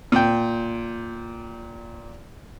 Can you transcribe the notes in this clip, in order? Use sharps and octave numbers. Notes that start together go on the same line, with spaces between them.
A#2 G5